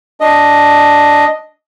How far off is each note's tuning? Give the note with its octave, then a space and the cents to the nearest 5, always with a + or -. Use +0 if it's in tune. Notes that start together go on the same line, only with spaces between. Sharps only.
D4 +0 D#5 +0